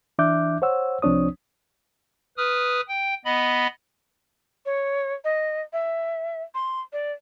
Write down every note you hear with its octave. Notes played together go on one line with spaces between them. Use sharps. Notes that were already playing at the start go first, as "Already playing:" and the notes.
E3 D4 E5 D6 F#6 G6
C5 C#5 F#5 E6
C2 F3 C4 D4 C#5 D#6
B4 D#6 F6
G5
B3 D#5 B5
C#5
D#5
E5
C6
D5